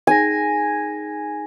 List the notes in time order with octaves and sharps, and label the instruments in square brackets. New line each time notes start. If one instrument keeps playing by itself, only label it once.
[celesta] D#4 G#4 A#6 [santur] G#5